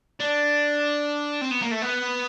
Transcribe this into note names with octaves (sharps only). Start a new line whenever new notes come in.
D4
C4
B3
A#3
A3
B3